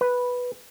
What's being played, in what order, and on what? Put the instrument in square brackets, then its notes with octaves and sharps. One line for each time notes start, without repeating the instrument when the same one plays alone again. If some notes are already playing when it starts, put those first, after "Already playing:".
[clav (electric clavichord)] B4